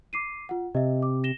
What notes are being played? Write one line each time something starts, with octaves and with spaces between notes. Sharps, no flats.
D6 C7 D#7
F4 F#5
C3 D#5 E5
D6
A#6 E7 G7